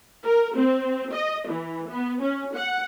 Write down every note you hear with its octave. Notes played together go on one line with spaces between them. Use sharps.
A#4
C4
D#5
E3
B3
C#4
F#5